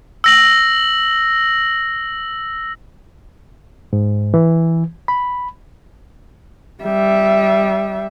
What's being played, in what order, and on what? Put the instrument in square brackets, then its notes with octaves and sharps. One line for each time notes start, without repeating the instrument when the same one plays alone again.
[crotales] E6 A#6 F#7
[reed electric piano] G#2
E3
B5
[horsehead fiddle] G3 E5